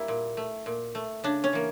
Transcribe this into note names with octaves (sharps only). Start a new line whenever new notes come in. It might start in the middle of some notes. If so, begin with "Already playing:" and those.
Already playing: G3 A#3 E4
A#2
A3
A#2
A3
C#3 D4
C#4
E3 A#3